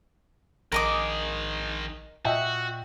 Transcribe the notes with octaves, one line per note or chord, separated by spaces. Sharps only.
A#1 D#3 G#4 A#4 D#5 D6
A#2 F#4 D#5 E5 G5